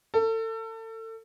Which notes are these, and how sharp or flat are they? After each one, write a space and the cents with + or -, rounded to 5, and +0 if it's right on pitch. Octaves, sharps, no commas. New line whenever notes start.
A4 +30